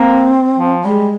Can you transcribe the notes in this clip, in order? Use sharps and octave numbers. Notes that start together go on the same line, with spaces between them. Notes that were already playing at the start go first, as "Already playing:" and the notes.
Already playing: A#3 C4
F3
G3 G#3